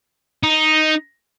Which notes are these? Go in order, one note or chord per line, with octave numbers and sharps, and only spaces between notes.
D#4